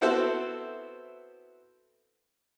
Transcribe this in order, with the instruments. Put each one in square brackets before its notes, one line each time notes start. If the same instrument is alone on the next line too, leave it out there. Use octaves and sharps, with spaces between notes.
[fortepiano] B3 C4 E4 F#4 A4 C5